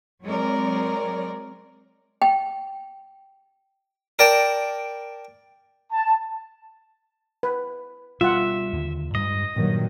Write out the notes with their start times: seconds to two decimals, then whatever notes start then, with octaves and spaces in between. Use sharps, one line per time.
0.23 F#3 G#3 C4 A#4 C#5 D5
2.22 G5
4.19 A#4 D5 G5 A5
5.92 A5
7.43 B4
8.21 B2 G3 F4 E5 F#5
8.73 D#2 D3
9.15 G2 G3 G#3 D#5
9.56 G2 A#2 D#3 F#3